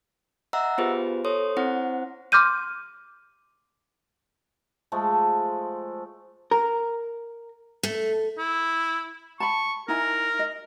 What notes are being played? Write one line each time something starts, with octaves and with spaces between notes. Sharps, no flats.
D#5 E5 F#5 A#5 E6
B3 F4 G4 G#4 B4 C5
A4 C5 C#5 C6 D#6
C4 E4 C5 F#5
C6 D6 F6 G6 D#7
F3 G#3 A3
A#4
A3
E4
A5 B5 C#6
D#4 E4 A#4 G#5
D#5